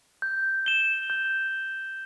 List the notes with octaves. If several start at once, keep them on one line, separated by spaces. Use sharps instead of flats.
G6
E7 G7
G6